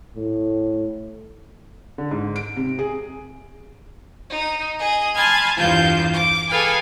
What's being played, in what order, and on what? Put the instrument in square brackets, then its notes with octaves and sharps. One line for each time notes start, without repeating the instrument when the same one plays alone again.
[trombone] A2
[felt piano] D3
G#2
D7
C3
G#4
[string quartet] D#4
G#4 D#5
G#5 A5 B5 C6 F6 G#6
E2 G2 F4 C5 F5 G6
D6
G#4 A4 B4 F5 G5 G#5